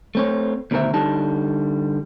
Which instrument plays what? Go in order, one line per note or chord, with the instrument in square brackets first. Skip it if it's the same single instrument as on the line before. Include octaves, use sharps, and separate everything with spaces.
[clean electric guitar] A3 C4 C#5
D2 B2 D#3 A#4 C5 E5
D3 G3 D#4 A5